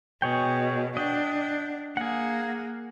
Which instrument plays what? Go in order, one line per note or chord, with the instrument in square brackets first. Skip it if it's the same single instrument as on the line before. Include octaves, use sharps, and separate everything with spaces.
[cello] B2 [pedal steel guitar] G#4 C#5 G5
[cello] D4 [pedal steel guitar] D#5 F#5 G5
[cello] A#3 [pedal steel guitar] G#4 F#5